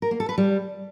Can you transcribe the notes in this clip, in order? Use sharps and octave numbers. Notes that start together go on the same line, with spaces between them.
A#4
A#3
A4
B4
G3